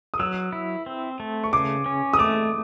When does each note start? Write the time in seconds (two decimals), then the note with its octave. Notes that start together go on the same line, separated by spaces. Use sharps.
0.14 D#6
0.19 F#3 E6
0.53 E4
0.86 C4
1.20 A3
1.44 C#6
1.53 C#3 D6
1.86 C#4
2.13 D#6
2.19 A3 D6